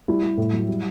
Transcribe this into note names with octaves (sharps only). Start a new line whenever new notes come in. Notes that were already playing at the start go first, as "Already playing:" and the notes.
G3 E4
G3
A2
F#3
G3